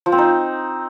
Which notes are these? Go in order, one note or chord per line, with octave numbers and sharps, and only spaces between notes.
F3
C4
D#4